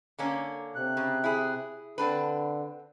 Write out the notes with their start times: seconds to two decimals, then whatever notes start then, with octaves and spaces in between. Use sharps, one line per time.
0.19 D3 A#3 C#4
0.76 C3 F#6
0.97 C#3
1.24 E4 G#4
1.98 D3 C4 D4 B4